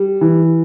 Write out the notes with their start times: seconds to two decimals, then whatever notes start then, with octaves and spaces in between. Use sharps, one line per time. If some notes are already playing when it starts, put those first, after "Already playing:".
Already playing: G3
0.21 E3